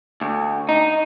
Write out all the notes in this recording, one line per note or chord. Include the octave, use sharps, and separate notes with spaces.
D2
D#4